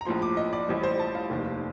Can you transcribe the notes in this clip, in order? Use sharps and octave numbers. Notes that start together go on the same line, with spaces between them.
A#5
A#1 A2 F3 C6
D6
D#5
D5
A1 A2 G3 C5
C5
A5
F5
F1 D#2 D#3